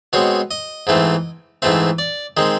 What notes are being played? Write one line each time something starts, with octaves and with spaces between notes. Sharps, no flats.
B2 G#3 C4 C#5
D#5
G#2 E3 A3 C4
G#2 E3 A3 C4 E5
D5
D#3 G#3 C4